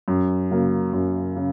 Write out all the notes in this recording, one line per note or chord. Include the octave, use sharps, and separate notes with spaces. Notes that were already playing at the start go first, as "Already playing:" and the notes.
F#2
C#3 F#3 A#3
F#2
C#3